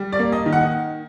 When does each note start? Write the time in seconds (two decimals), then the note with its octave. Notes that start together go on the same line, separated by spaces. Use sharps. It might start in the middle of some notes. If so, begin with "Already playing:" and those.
Already playing: G3
0.12 D5
0.19 A#3
0.32 D#5
0.46 D#3
0.53 F#5
0.61 D#5